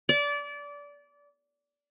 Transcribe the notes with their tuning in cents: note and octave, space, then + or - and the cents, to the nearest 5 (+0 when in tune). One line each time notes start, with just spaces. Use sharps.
D5 -25